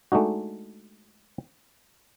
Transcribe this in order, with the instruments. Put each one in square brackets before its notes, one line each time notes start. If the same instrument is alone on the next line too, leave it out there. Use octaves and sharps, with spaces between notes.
[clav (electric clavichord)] G#3 A3 D4 D#4 F#4